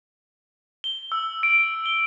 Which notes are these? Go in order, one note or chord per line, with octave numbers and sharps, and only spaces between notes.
G7
E6
D7
G7